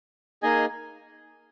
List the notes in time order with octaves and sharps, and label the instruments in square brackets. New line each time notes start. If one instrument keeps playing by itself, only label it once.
[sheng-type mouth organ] A#3 D#4 G#4 D#5 G#5